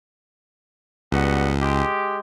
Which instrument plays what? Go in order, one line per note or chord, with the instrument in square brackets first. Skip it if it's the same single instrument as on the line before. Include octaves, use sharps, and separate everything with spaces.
[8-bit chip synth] C#2 [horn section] G3 B3 F#4
[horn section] G#3 G4